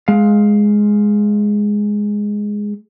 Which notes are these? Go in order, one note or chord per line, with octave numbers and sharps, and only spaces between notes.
G#3 F5